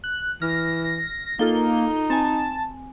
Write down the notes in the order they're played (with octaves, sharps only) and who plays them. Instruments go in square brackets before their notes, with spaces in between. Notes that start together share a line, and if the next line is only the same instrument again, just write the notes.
[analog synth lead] F#6
[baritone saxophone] E3 [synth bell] F6 [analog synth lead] A#6
[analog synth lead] A#3 [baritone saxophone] D#4 [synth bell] F4 A4 G7
[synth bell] C4 G#5 [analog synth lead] A5